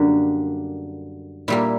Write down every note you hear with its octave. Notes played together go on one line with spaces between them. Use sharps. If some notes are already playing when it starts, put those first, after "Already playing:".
Already playing: F#2 D3 G3 A#3 D4 F#4
A#2 G3 A#3 E4